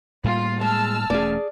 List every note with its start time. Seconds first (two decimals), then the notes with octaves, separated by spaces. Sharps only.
0.24 A2 G3 A#3 F4
0.61 G#3 A5 E6 F6
1.10 E1 A3 C#4 G#4 D5